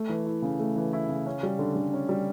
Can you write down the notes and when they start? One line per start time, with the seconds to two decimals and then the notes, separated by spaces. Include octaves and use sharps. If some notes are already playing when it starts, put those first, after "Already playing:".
Already playing: A3
0.09 E3
0.26 E4
0.42 C#3
0.59 A3
0.76 E3
0.93 E4
1.09 C#3
1.26 C#4
1.43 G3
1.59 D3
1.76 D3
1.94 C#4
2.09 G3